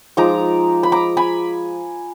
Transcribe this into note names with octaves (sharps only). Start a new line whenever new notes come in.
F3 G#3 D#4 A#5 D6
B5
A#5 D6
G#5 B5